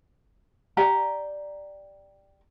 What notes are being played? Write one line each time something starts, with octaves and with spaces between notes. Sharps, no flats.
G4 D5 A#5